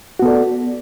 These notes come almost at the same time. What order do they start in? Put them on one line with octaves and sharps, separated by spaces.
F#4 B3 A4 D5